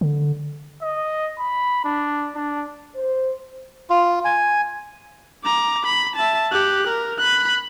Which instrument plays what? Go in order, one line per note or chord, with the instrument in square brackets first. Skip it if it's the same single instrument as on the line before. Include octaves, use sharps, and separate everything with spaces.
[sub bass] D3
[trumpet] D#5
B5
D4
D4
[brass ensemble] C5
[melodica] F4
G#5
[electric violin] A#5 D6
B5
E5 A5
G4 F#6
A#4
B5 F#6